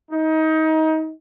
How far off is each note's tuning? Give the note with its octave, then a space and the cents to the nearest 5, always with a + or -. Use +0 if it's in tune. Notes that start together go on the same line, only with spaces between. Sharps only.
D#4 +25